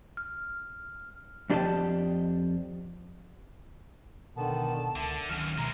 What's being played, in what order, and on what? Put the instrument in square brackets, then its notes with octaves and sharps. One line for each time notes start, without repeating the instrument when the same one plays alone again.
[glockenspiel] F6
[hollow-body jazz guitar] F2 D4 G4 D#5 G5 A5
[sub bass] B2 [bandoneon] D3 D#3 B3 [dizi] A5
[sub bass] C#2 [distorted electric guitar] D3 [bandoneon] E5
[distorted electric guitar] F#2 E3 [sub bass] D#3 [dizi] F6
[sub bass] B2 [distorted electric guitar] E3 G#3 [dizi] A#5